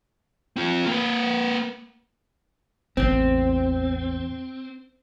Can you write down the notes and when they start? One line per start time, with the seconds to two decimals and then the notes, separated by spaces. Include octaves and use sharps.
0.56 C4 F4
0.87 A#3 B4
2.97 A1 E2 C4